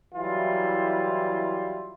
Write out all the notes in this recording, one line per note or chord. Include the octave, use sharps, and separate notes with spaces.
E3 F#3 G3 E4 F4